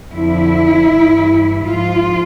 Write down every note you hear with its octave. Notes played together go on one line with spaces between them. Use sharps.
F2 D3 F3 E4
G2 E3
G#2 F3 F4